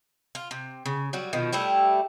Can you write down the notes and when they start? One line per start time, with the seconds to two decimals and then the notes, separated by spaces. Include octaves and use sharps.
0.35 F4
0.51 C3
0.86 C#3
1.13 F#3 G3 F#4
1.33 B2 D#3 F3
1.52 G3 A3 E4 G4